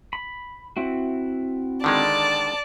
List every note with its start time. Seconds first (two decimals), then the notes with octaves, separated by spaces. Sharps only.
0.13 B5
0.77 C4 E4 F#4
1.84 D3 D#3 G#3 D5 A5